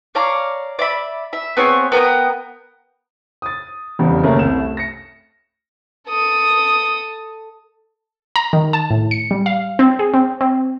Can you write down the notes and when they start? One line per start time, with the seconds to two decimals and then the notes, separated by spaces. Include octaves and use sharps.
0.15 C#5 D5 F5 A#5
0.79 D5 E5 B5
1.33 E5
1.57 B3 C4 G#4 C#5
1.92 B3 A#4 G5 D#6
3.42 D#6 A6
3.99 F1 E2 C#3 G3
4.23 F#1 D#2 A3 A#3 C#4
4.39 C2 E7
4.58 A3
4.77 A#6 C#7
6.09 A4 D#6
8.36 A#5
8.53 D#3
8.73 A5
8.90 A2
9.11 C#7
9.31 G3
9.46 F5
9.79 C4
9.99 G#4
10.14 C4
10.41 C4